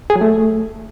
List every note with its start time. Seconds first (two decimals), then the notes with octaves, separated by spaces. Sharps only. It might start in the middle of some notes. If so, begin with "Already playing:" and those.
0.10 G#4
0.16 F#3
0.21 A3